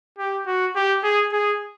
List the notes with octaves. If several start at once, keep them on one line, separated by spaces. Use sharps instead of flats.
G4
F#4
G4
G#4
G#4